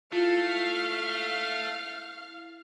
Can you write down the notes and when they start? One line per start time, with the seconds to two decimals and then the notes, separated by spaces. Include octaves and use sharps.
0.13 A3 E4 F4 F5 F6